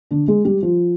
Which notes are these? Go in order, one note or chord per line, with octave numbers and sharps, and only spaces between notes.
D3 D4
G#3 G#4
G3 G4
F3 F4